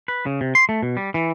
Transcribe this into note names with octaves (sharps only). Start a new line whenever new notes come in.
B4
C#3
C3
C6
A3
B2
G3
E3